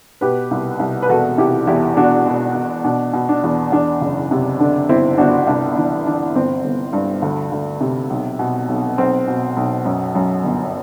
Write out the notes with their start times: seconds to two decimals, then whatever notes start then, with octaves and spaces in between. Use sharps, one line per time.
0.21 B2 G4 B4
0.51 C2
0.79 C2
1.02 B4
1.09 E1 F#4 A4
1.38 C3 E4 G4
1.67 E2 E4 G4
1.96 E1 D4 F#4
2.27 B2
2.55 B2
2.84 B2 D4
3.13 B2
3.29 D4
3.43 E2
3.72 E2 D4
4.01 F#1
4.31 C3
4.59 D3 D4
4.89 G1 C4 E4
5.18 G1 D4 F#4
5.47 C2 D4
5.76 E3 D4
6.06 E3 D4
6.35 G1 C4
6.64 G1
6.93 G2
7.22 D2
7.52 D2
7.81 C3
8.10 B1
8.39 B2
8.68 B1
8.98 B1 C4
9.28 B2
9.57 B1
9.85 F#2
10.15 F#2
10.43 G1